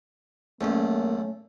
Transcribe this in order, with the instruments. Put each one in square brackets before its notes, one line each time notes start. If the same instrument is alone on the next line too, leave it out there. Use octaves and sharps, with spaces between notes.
[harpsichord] B1 E2 [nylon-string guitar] A3 C#4 [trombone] A#3